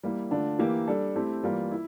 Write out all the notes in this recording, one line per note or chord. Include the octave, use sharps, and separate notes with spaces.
G3 A#3 E4
D3 A3 D4 F4
E3 A#3 E4 G4 A#4
G3 D4 A4
A3 C4 E4 G4
E3 G3 A#3 F4 A#4
E4